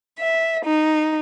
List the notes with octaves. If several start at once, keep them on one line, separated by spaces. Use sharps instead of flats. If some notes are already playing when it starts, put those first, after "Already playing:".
E5
D#4